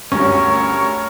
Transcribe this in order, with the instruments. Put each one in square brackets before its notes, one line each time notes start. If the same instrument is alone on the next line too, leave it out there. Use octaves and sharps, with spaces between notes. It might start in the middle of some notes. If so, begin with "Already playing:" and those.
[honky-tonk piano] D2 G2 [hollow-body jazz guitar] C#4 [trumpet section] A#4 C#5 [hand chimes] C#6